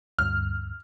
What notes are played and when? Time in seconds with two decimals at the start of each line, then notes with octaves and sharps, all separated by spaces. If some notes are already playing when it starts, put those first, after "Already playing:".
0.19 D2 G2 F6